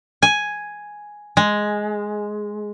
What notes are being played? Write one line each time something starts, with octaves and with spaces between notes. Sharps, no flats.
G#5
G#3